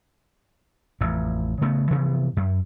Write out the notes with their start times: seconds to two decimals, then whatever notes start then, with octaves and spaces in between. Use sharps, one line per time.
1.01 A1 F2
1.61 C#3 A3 B3
1.91 C3 E3 F3 B3
2.37 F#2